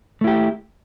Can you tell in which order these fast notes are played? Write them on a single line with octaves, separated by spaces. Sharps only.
A3 E4 G4